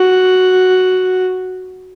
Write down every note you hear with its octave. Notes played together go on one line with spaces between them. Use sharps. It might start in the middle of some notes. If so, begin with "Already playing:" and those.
Already playing: F#4